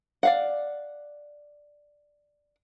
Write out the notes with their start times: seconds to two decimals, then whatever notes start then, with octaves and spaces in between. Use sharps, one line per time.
0.23 D5 F5 F#5